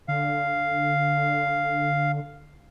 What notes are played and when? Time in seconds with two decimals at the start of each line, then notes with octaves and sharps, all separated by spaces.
0.08 D3 F5